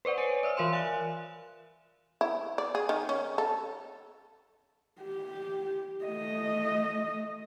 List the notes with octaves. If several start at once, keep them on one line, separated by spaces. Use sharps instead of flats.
B4 C5 D5 F#5
C#5 G#5 D#7
D5 E5 E6
E3 A#4 E5 F5 C6 E7
G#5 F#6
E4
D5
G#4
D#3
C#4
A4
G4
A3 D#5